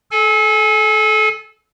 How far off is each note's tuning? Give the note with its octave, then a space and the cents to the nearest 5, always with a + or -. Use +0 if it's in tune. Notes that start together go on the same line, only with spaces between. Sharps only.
A4 -30 G#5 +5